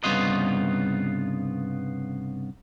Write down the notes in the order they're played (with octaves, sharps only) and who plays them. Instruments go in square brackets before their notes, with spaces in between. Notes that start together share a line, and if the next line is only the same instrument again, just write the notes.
[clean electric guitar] C2 G2 C#3 B3 F4 D#5